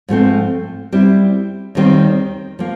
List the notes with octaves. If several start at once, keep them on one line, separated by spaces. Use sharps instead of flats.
G#2 F3 A3 C4
G3 C4 E4
D#2 D#3 G3 C4
F3 A#3